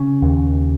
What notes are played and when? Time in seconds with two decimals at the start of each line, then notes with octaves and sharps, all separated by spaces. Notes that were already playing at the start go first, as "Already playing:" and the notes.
Already playing: C#3 C#4
0.22 D#2